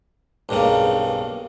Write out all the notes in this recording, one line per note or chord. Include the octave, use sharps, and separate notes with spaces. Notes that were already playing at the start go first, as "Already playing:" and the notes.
B1 G2 C#3 A#3